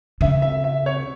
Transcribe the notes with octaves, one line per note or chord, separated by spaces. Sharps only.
C#3 E5
E5
E5
C#5